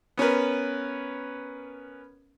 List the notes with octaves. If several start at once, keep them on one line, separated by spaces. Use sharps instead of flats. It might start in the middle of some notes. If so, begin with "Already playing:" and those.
B3 C#4 A#4 B4